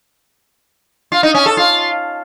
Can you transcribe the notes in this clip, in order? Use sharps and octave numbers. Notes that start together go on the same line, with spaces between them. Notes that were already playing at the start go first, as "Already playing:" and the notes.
F4
D#4
C#4
A4
F4